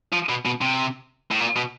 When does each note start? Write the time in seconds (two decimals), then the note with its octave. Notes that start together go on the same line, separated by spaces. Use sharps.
0.13 F3
0.29 B2
0.45 B2
0.61 C3
1.31 A2
1.40 A#2
1.56 B2